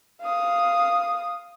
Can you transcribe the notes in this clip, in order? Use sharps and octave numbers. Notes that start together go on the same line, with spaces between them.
F5 D#6